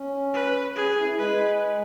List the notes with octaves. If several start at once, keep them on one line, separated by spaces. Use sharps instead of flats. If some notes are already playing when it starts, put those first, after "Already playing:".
Already playing: C#4
B4
C#4 G#4
C#4
E4
E4
G#3 B4